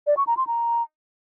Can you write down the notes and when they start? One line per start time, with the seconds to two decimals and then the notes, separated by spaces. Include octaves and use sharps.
0.07 D5
0.17 C#6
0.27 A#5
0.37 C6
0.47 A#5